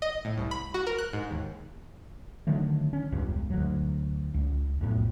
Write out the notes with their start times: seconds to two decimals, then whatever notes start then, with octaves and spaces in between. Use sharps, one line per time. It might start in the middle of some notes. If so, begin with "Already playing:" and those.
0.02 D#5
0.25 A2
0.38 C2
0.51 B5
0.74 F#4
0.87 A#4
0.98 F#6
1.13 G#2
1.31 D#2
2.47 D3 D#3 F#3 A3
2.93 C#4
3.12 E1 C#2 G2
3.50 D2 F#3
4.34 C#2
4.81 B1 F2 A2